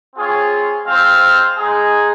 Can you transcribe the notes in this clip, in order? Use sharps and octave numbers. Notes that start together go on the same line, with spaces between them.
C4 F4 G#4 C#5
G#3 C4 F4 C5 F5
G#3 D#4 G#4